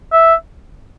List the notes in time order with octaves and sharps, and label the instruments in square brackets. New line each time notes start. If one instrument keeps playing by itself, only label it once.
[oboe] E5